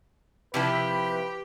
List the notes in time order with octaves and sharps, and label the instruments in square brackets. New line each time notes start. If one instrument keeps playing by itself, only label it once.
[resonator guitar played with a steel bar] C3 F3 E4 [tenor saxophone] G4 [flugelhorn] B4